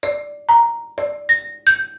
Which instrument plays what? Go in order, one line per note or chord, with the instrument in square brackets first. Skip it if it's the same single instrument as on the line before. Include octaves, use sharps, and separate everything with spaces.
[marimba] D5
A#5
D5
A#6
G6